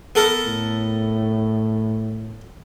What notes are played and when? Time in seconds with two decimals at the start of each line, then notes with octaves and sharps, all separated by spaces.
0.15 B3 A4 A#4
0.46 A2